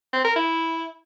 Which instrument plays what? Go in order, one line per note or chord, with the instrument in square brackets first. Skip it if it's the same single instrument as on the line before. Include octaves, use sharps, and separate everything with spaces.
[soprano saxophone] C4
A#4
E4